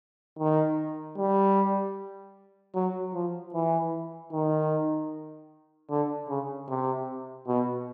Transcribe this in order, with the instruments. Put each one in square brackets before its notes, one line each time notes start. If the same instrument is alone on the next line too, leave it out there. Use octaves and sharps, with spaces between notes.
[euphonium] D#3
G3
F#3
F3
E3
D#3
D3
C#3
C3
B2